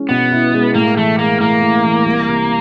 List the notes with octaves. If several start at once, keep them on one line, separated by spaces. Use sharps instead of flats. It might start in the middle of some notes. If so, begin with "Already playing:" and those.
Already playing: G#3 C#4 E4
B2 B3
E4
G#3
A2 A#3
E3 A3
G#3 A#3
A2 A#3
A2
E3
C2
C3